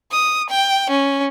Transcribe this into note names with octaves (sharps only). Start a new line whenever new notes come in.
D#6
G5
C#4